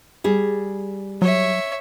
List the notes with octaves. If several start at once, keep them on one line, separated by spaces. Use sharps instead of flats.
G3 G#4
F#3 C#5 E5